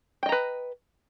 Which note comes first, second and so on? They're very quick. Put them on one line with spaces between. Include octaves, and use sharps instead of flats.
G5 D#5 A#5 B4